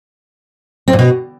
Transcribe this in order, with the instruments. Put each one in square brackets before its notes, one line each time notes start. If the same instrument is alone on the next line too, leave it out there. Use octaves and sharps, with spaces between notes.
[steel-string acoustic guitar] C4
A#2
B2